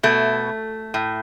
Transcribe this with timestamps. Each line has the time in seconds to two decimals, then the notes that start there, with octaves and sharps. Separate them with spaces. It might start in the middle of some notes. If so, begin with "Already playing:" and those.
0.03 B2 A3
0.94 A2